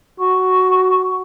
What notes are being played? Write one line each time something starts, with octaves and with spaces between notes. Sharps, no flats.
F#4 C#6